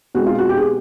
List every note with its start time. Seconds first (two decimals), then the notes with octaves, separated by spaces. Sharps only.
0.15 B2 G#3 C4 F#4
0.26 F4
0.38 F#4
0.49 G4
0.57 G#4